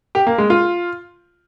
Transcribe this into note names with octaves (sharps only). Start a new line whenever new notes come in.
G4
A#3
G#3
F4